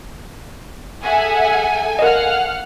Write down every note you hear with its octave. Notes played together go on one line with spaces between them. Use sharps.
G#4 A4 E5 F#5 G#5
A#4 D#5 F5 F#5 F6